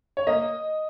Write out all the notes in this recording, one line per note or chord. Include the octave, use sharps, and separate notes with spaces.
C#5
A#3 D#5